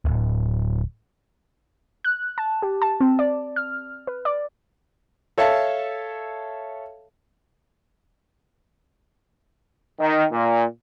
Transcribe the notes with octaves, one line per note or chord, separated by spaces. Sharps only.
D1
F#6
A5
G4
A5
C4
D5
F6
B4
D5
A4 C#5 E5 F5 A5
D#3
A#2